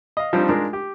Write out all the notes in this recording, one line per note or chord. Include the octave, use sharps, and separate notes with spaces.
D#5 F5
F3 G3 C4 D4 D#4
G#3 D4 D#4 F4 A#4
G4